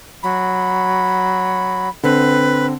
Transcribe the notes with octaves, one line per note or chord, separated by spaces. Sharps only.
F#3 B5
D3 C4 B4